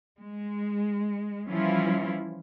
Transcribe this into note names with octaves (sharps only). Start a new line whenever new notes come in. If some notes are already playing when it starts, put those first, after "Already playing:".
G#3
E3 F3 G3 C#4 E4 F4